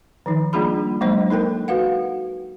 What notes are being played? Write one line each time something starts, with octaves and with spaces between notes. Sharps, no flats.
D#3 F3 D#4
G3 A#3 D4 F4 G#4 B5
F#3 G#3 A#3 D4 C5 D#5
D#4 A4 A#4 G5
F#4 B4 F5 F#5